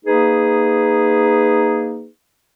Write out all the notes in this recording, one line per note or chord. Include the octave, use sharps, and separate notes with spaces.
A#3 D#4 G#4 B4